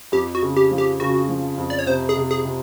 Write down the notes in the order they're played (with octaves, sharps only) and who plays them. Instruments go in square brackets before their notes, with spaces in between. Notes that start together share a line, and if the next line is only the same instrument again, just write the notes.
[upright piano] F2 [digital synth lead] G4
[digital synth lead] F#4
[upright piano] C#3
[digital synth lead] G4
[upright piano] F3
[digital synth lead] G4
[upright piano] C#3 [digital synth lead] F#4
[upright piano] F3
F2
[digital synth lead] D5
C#5
[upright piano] C3 [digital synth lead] C5
[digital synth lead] G#4
[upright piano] C3
[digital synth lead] G#4
[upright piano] C3